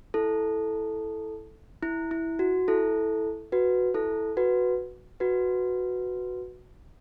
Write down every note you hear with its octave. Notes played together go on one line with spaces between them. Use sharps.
E4 A4
E4
E4
F#4
E4 A4
F#4 B4
E4 A4
F#4 B4
F#4 B4